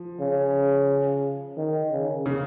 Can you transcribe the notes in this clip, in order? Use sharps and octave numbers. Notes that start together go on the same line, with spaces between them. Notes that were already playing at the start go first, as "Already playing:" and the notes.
Already playing: F3
C#3
D#3
C#3
C#3